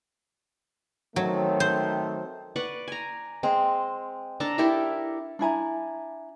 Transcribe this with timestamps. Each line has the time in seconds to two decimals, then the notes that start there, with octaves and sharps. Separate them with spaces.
1.16 D#3 F#3 A3 C4
1.60 C5
2.56 B4 D5 F#5 C#6
2.88 G#5 A#5
3.43 G#3 C4
4.40 D4 A4 A5 A#5
4.58 E4 G4 A4 A#4
5.39 D4 E4 G#5 A#5